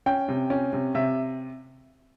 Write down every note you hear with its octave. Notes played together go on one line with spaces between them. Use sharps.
C#4 G5
C3
C#4
C3
C3 E5